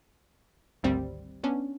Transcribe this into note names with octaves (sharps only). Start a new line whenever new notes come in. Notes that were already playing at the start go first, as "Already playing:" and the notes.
G#1 D2 G3 C4
B3 C#4 D4